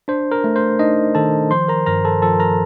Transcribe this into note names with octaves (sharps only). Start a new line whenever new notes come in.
D4 C5
A#4
A3
C5
D4 D#4 D#5
D#3 A4 A5
F3 C5 C6
A#4 A#5
G2 A#4 A#5
A4 A5
F3 A4 A5
A#4 A#5